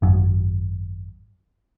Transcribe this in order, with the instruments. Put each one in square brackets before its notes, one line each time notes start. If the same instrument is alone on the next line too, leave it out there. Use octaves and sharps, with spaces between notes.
[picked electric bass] G#1 F#2